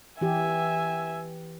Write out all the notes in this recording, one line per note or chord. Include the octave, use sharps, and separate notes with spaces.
E3 G4 E5 G#5